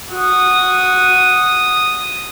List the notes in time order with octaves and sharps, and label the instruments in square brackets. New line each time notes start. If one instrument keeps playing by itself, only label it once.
[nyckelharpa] F#4 [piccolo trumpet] D#6